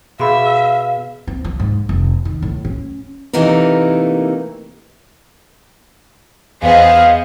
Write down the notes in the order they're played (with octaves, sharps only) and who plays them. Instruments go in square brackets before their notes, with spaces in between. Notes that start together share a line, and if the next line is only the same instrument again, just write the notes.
[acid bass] B2 [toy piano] F#4 G#4 B5 [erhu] E5 [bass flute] F5
[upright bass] C4
F3
G#2
F1
D#3
A2
C#4
[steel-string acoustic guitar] C3 E3 A3 A#3 D#4 A#4
[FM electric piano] E2 B6 [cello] B3 [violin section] G#4 C5 D#5 [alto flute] F5